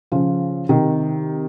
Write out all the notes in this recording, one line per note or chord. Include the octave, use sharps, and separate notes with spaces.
C#3 F3
C3 D#3